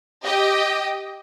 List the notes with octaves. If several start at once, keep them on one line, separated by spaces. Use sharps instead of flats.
G4 D#5 G5